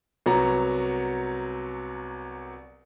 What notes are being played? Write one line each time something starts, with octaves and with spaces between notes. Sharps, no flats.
C2 F#3 B3 A#5